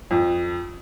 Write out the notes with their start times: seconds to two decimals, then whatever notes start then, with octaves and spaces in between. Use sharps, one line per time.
0.11 F2